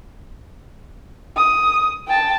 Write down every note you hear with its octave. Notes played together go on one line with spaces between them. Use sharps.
D#6
G5 A5